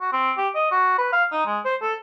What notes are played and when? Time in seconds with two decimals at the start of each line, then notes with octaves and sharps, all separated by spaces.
0.01 F#4
0.13 C4
0.38 G4
0.55 D#5
0.71 F#4
0.98 B4
1.13 F5
1.32 D#4
1.47 G#3
1.65 C5
1.82 A4